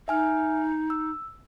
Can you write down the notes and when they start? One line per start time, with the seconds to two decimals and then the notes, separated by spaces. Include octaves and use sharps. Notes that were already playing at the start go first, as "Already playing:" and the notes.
0.08 D#4 E5 G#5 F6
0.90 E6